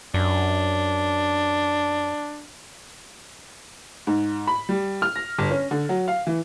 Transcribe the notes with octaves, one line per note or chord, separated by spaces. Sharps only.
F#2 D4
G#2
B5
G3
F6
A#6
G1
C#4
D3
F#3
F5
E3